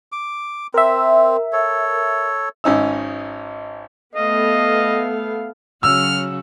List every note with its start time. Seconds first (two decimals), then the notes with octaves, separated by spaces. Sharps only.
0.12 D6
0.74 C4 A#4 E5
1.53 A4 C#5
2.64 G#1 C#4 D#4 E6
4.15 A3 B3 D#5 F5
5.83 C#3 F#3 F#4 E6 F6